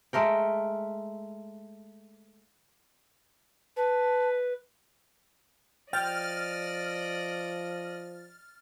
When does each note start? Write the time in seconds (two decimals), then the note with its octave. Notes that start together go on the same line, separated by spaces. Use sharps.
0.13 G#3 A3 A#4 G5
3.76 B4 A5
5.93 F3 D5 D#5 G5 F6 A6